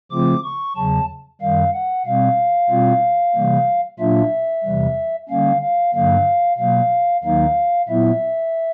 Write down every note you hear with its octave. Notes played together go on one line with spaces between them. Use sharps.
C#3 F3 A3 C4 F4 D6
C#6
E2 C#3 F#3 A5
F#2 D#3 G3 F5
F#5
B2 G3 C4 F5
B2 G3 C4 F4
C3 E3 G3 A#3
A#2 F#3 A#3 D4 F4 E5
E2 C3 E3 G3
D3 G3 A#3 C#4 F5
F5
G2 D3 F#3 A#3 F5
B2 F#3 A#3 F5
D#2 D#3 F#3 A#3 D#4 F5
A#2 F#3 B3 E4 E5